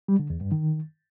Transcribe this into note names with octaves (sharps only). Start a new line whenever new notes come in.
G3
D3
E2
G2
D#3